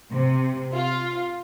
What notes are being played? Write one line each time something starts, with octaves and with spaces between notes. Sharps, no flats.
C3
F4